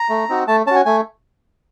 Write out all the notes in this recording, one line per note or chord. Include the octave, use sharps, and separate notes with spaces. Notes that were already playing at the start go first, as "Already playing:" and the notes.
Already playing: A#5
A3
C4 D#4 F#4
A3 A5
C#4 F#4 G#5 A5
A3 G#5